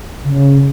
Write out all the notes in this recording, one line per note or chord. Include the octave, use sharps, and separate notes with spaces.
C#3